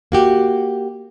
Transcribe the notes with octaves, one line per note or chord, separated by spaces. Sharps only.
A#3 F#4 G4